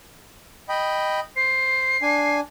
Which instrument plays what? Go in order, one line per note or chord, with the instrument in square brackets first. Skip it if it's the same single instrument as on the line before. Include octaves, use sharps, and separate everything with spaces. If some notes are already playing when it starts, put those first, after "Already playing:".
[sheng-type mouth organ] D#5 G5 B5
[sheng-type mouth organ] C5 [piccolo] C7
[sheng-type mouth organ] D4 G#5